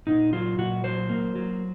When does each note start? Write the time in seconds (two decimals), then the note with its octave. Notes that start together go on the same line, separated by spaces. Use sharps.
0.07 A#2 D#4
0.33 F#3 F4
0.58 A#2 F#4
0.84 F#3 C5
1.09 A#3
1.35 F#3